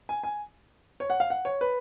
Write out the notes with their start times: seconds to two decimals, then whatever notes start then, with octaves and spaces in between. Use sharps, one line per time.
0.09 G#5
0.23 G#5
1.00 C#5
1.10 F#5
1.20 F5
1.30 F#5
1.45 C#5
1.61 B4